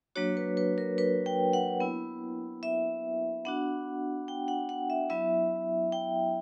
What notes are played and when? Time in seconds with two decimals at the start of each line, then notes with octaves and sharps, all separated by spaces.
0.15 F#3 A#3 D4 F#4 C#5
0.37 B4
0.57 B4
0.78 A#4
0.98 B4
1.26 G5
1.53 F#5
1.80 B3 E4
2.63 E5
3.45 B3 D4 F#4 F#5
4.28 G5
4.48 F#5
4.69 F#5
4.90 E5
5.10 F#3 B3 E4 E5
5.92 G5